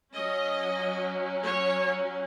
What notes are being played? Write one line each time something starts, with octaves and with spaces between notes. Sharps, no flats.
F#3 C#4 D#5
C#5